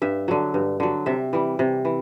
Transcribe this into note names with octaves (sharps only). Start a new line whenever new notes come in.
G2 E5
D3 F#3
G2
D3 F#3
C3 E5
E3 G3
C3
E3